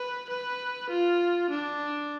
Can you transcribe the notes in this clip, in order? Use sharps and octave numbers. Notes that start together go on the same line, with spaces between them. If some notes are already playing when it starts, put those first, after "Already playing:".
Already playing: B4
B4
F4
D4